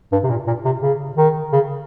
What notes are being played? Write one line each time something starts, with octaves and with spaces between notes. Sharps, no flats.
G2
C3
A#2
A#2
C3
C#3
D#3
C#3